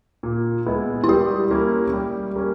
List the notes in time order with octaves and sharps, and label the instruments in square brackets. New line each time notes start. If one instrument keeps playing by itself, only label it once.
[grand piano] A#2
G#3 B3 E4
[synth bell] E4
[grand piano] G3 [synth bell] G4
[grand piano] A#3 C#4 E4
G3
A#3 C#4